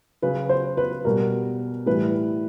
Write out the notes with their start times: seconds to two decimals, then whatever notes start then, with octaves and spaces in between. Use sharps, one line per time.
0.22 C#3 F#3 B4
0.49 C5
0.77 B4
1.05 B2 G3 A#4
1.86 A2 E3 G3 B4